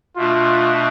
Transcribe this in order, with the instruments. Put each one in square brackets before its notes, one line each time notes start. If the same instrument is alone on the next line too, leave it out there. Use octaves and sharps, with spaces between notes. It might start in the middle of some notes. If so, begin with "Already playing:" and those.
[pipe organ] B2 A3 D4 [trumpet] F4